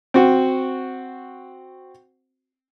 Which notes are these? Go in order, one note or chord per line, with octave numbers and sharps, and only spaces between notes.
C4 F#4